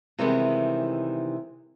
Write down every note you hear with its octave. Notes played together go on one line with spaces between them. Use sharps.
C3 D#3 E3 G3 G#3 B3